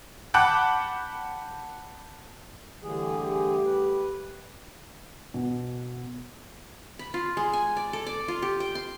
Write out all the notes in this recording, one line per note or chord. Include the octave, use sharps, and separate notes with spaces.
F#5 G5 A5 B5 D6 F#6
D3 E3 G3 A3 G4 G#4
B4
B2
B5
F4
G#3
G#5
D5
A4
D5
F4
G4
G5
C6